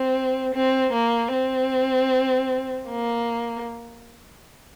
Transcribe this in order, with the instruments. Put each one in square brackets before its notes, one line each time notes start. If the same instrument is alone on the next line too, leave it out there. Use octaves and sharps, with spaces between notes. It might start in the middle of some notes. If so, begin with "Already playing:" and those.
Already playing: [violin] C4
C4
A#3
C4
A#3